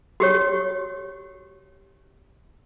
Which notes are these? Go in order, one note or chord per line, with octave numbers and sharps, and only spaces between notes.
F#4 G4 C#5